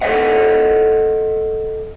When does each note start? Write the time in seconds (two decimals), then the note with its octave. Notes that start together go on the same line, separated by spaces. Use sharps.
0.01 A4 C5 C#5 D#5 E5 F#5